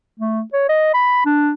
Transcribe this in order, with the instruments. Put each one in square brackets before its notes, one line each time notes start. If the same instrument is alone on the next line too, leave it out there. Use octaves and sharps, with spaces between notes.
[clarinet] A3
C#5
D#5
B5
D4